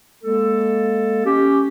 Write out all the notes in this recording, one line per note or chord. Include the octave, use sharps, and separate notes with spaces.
G#3 A#3 A4
C#4 G4